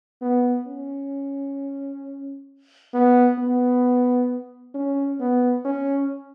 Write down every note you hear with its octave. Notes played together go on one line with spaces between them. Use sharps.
B3
C#4
B3
B3
C#4
B3
C#4